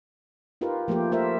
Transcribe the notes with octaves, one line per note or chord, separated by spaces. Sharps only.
D#4 F4 G4 A#4 B4
F3 A3 A#3 F4 G4
A3 F4 G4 A#4 C5 E5